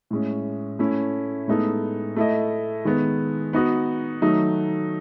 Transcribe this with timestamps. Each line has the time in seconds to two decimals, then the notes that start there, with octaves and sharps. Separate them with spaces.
0.11 A2 G#3 C#4
0.79 A3 C#4 E4
1.48 A2 G#3 B3 D#4 A4
2.16 A3 E4 A4 D#5
2.85 D#3 G#3 B3
3.53 B3 D#4 F#4
4.22 D#3 F#3 A3 D#4